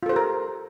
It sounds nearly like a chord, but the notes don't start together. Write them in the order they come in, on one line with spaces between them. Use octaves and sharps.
F4 A4 C5 G4 A#4